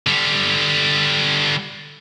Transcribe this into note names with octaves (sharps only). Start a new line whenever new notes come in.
D3 G3